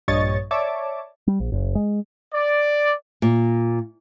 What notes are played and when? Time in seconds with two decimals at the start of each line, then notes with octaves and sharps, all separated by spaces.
0.08 A#1 G2 C#5 D#5 C#6 A6
0.51 C#5 D5 E5 A5 D6
1.27 G3
1.40 A#1
1.52 F#1
1.75 G#3
2.32 D5
3.22 A#2